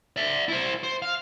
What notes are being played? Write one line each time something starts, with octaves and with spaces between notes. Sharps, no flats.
D5 E5
E4 C5
C5
F5